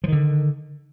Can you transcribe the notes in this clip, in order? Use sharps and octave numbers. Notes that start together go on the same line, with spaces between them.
D3 D#3 F3